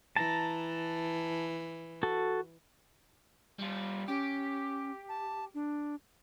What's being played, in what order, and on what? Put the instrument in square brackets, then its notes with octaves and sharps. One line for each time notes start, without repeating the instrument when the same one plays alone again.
[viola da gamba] E3 [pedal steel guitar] A5 A#5
[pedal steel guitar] F#4 A4
[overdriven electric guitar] G3 F4
[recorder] C#4 [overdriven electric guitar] G4
[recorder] A5
D4